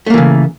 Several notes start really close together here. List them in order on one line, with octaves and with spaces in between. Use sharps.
A3 A#3 E3 C#3